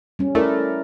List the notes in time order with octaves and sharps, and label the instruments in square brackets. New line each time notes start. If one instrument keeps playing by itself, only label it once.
[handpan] G3 C#4
[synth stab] A3 [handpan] E4 A#4 D5